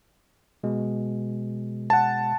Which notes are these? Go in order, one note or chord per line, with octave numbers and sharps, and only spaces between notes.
B2 G#3
F#5 A5